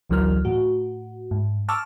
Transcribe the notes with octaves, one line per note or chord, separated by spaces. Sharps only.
A1 D2 E3 F#3 A#4 F6
A2 F#4
G#2
A5 C#6 D6 E6 F6